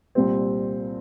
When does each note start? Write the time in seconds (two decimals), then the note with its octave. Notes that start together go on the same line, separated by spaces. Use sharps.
0.15 C2 A#2 G3 C4